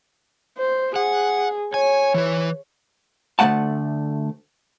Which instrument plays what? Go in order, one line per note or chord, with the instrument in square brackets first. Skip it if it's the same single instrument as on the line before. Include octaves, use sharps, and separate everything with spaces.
[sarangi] C5
[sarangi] G#4 [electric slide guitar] F#5
[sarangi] C#5 [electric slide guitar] G#5
[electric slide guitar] E3 B4
[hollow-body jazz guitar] D2 F#3 A3 F#5 A5